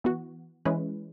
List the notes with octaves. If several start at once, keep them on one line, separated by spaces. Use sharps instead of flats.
E3 B3 F#4
E3 G#3 C#4 E4 B4